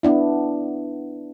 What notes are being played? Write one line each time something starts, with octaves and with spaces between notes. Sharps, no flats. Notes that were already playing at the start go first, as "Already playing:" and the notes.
B3 D4 E4